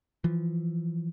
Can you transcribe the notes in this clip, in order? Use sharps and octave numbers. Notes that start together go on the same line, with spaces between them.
E3 F3